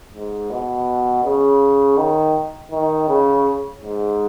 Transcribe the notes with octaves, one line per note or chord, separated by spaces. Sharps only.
G#2
B2
C#3
D#3
D#3
C#3
G#2